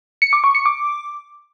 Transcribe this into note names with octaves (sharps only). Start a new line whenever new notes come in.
C#7
D6
C#6
C#7
D6